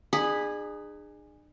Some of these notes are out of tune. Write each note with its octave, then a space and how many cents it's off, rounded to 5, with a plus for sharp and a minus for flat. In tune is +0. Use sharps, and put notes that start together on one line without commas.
D4 +45 G#4 -10 B5 +0